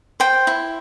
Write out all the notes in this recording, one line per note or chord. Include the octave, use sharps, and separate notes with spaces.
C5 G5
E4